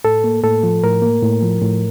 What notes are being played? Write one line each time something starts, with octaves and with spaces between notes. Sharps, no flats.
A2 A4
A#3
A2 A4
F3
A2 A#4
A#3
A2
F3
A2